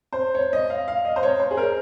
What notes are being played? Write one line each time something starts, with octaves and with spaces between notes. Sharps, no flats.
C5
C#5
D#5
F5
F5
D#5
C5
C#5
C5
G#4
A#4